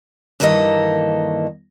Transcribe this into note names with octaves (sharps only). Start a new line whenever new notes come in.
G2 D#3 E3 A#3 A4 D#5